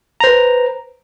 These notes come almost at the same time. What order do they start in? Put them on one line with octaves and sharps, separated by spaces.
A#5 C5 B4